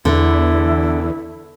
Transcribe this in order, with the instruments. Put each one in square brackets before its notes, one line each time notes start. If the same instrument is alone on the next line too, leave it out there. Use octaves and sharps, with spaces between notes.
[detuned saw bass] E2 [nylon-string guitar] D3 [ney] E4